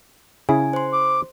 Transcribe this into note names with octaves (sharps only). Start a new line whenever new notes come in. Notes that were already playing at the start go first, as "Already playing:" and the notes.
C#3 E4 G#4 G#5
C5 C6
D6